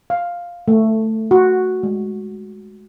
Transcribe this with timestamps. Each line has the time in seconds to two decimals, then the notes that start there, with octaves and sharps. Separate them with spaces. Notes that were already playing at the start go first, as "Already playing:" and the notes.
0.10 F5
0.68 A3
1.31 F#4
1.83 G#3